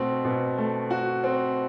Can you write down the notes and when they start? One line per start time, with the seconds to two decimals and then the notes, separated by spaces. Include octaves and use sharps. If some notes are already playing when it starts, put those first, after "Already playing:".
Already playing: B2 A3 C4 F#4
0.25 B2
0.58 A3
0.90 F#4
1.23 C4